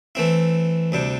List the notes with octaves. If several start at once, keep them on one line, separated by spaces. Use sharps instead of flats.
E3 A3 C4 E4
D2 C3 G3 D4